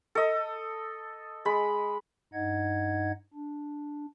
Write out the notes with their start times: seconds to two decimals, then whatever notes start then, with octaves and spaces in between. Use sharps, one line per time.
0.15 A4 D#5
1.45 G#3 B5
2.33 G2 D#4 D#5 F#5 G#6
3.34 D4